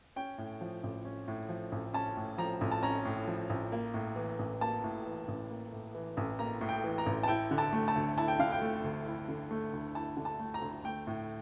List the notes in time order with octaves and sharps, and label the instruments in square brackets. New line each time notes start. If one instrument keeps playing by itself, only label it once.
[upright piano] C#4 G5
A2
F3
A1
C#4
A2
F3
A1
C#4 A5
A2
F3 A#5
A1
A5
C#4 A#5
A2
F3
A1
A#3
A2
E3
A1
A#3 A5
A2
E3
A1
A#3
A2
E3
A1
A#3 A#5
A2
G5
E3
A#5
A1
A5
E4 G5
D3
A5
A3
A5
D2
E4 A5
G5
D3 F5
G5
A3
D2
E4
D3
A3
D2
E4 A5
D3
A5
A3
A#5
D2
A3 G5
A2